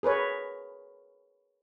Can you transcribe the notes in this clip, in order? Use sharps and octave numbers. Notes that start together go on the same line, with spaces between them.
G#4 A#4 B4 C#5